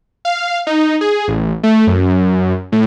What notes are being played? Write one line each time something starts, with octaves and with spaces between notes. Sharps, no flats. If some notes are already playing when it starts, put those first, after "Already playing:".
F5
D#4
G#4
A1
A3
F#2
A2